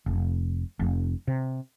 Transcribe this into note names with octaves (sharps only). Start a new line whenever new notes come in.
F1
F1
C3